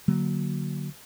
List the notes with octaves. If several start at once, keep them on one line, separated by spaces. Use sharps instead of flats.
D3 F#3 A#3